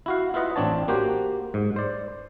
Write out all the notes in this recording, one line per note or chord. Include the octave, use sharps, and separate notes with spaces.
E4 F#4 F5
E4 F4 B4 D#5 F#5
A1 C4 D4 C#5 A5
A#3 F#4 G4 C5
G#2
C5 D5